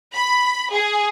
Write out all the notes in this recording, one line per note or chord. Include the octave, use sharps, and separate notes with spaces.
B5
G#4